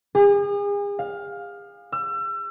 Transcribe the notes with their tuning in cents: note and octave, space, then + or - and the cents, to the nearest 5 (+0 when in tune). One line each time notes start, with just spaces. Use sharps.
G#4 -40
F5 +15
E6 +35